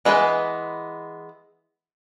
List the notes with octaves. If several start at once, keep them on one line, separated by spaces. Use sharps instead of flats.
E3 G#3 B3 D4 B4